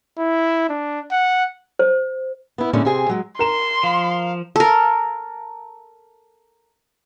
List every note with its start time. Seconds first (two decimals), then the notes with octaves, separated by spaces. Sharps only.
0.19 E4
0.69 D4
1.11 F#5
1.79 C5
2.58 B3 E4
2.73 A#2 D3 G#3 C#4 D#4 E4
2.85 C3 C4 G#4 G#5
3.09 F#3 G#3
3.39 A#4 A#5 C6 E7
3.83 F3 F5
4.56 A4 A#4